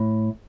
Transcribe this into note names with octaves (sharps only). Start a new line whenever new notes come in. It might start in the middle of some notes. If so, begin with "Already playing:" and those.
Already playing: A2